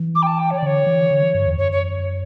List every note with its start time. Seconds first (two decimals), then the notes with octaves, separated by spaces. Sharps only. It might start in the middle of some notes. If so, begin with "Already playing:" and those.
Already playing: E3
0.15 D6
0.22 G5
0.27 A5
0.39 G5
0.50 C#5
0.57 D5
0.62 D3 C#5
0.86 E3
1.11 D3
1.22 E3
1.34 G2
1.46 E2
1.58 F#2 C#5
1.72 C#5